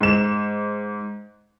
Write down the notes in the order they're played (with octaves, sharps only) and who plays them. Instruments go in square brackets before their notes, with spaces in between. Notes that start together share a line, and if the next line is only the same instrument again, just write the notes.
[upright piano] G#2 E7